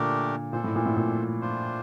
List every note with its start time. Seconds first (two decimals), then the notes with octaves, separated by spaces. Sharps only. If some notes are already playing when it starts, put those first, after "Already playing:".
Already playing: A#2 D3 A3 D4 G4 A#4
0.53 A#2 C5
0.56 D4 A4
0.64 A2
0.76 A#2
0.86 A2
0.97 A#2
1.41 D4 F4 C5